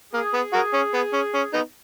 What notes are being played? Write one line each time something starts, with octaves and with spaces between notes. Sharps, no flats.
A#3 G#4
B3
F#4 A#4
C#4
B3
C#4
C#4
B3 D#4